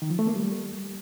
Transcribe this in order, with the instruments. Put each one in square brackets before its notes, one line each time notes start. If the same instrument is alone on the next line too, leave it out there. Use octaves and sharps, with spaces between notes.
[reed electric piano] D#3
F3
A3
A#3
G3